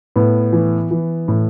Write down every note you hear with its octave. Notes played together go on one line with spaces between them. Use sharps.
A2 B3
E3
E3
A2